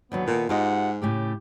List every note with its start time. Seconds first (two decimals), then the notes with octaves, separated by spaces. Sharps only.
0.12 D#2 D3 F#3 B3
0.27 A#2 D#3 A4
0.49 G#2 F4 G4 D#5 F#5
1.02 A2 C#3 A3 G4